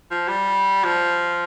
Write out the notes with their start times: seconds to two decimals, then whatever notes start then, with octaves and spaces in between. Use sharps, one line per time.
0.11 F3
0.28 G3
0.84 F3